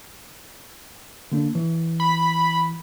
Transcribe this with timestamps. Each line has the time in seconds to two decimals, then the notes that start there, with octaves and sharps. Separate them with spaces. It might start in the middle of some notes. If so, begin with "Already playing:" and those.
1.32 D3 A#3 D4
1.55 E3
2.00 B5